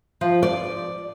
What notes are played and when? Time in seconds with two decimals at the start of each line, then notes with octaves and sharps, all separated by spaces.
0.21 F3
0.43 D5